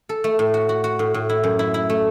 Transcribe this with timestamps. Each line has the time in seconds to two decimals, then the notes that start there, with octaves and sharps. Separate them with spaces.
0.09 A4
0.24 A3
0.39 A2
0.54 F#4
0.69 F#4
0.84 F#4
0.99 A2
1.14 A2
1.29 E4
1.44 F#2
1.59 E4
1.74 E4
1.90 A3